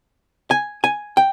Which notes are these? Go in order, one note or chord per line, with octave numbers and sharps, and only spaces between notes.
G#5
G#5
G5